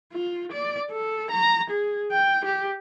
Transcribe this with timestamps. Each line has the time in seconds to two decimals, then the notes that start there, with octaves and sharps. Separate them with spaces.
0.13 F4
0.52 D5
0.91 A4
1.31 A#5
1.70 G#4
2.12 G5
2.45 G4